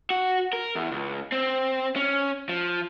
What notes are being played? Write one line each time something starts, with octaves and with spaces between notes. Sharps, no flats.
F#4
A#4
E2
C#2
C4
C#4
F3